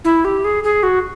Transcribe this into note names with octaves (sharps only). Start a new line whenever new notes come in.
E4
G4
G#4
G#4
F#4